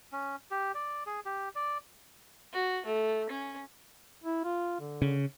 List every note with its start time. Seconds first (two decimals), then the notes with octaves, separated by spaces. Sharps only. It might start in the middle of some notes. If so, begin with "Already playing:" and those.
0.12 C#4
0.51 G4
0.74 D5
1.06 G#4
1.25 G4
1.55 D5
2.53 F#4
2.86 A3
3.30 C#4
4.23 E4
4.44 F4
4.80 D3
5.02 C#3